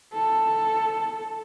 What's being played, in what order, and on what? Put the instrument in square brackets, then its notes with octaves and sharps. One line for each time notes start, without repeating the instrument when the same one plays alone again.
[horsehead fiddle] A4